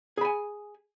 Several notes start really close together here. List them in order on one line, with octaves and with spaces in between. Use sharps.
G#4 B5 G#5